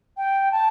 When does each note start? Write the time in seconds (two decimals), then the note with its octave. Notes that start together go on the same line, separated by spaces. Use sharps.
0.17 G5
0.52 A5